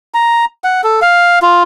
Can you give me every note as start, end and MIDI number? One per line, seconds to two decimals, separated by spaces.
0.14 0.45 82
0.64 0.81 78
0.84 1.00 69
1.02 1.39 77
1.42 1.63 65